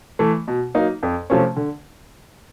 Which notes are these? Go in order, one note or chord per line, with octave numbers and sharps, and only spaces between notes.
E3 A3
B2
F#3 A#3 D#4
F2
C3 F3 A3 C#4
D3